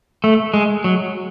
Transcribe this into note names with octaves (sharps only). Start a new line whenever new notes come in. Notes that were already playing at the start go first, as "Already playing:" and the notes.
A3
G#3
F#3